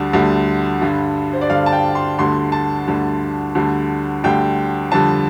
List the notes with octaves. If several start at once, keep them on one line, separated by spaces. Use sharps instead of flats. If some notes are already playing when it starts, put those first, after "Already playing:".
Already playing: D2 D3 G3
D2 D3 G3
G2 D3 G3
C5
D5
G2 D3 G3 F5
A5
G5
C6
D2 D3 G3 C6
A5
D2 D3 G3
D2 D3 G3
D2 D3 G3 G5
F2 D3 G3 A5